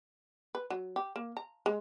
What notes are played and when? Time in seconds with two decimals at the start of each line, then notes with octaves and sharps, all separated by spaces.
0.55 B4
0.70 F#3
0.96 G4
1.16 A#3
1.37 A#5
1.66 G#3